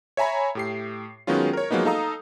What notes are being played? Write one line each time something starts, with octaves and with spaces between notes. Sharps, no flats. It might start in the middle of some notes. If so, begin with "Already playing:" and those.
C#5 E5 G#5 A#5 B5
A2 G4 C7
D#3 F#3 G#3 B3 C#4 F4
A#4 C#5
F3 F#3 G#3 A#3 B3 D#4
D#4 A4 F5 A#5 D#6